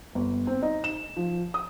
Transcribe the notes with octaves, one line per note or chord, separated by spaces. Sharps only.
G1
C4
D#4
E7
F3
D#6